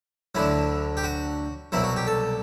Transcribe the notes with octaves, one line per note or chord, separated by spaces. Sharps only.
D2 D3 F#3 E4
G4
F#4
C2 B2 F#3 E4
F#4
G4
A4